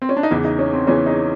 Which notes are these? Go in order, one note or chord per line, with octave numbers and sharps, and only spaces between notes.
C4
C#4
D4
D#4
E2 C#3 E3 E4
D#4
C#4
C4
E2 C#3 E3 C#4
D#4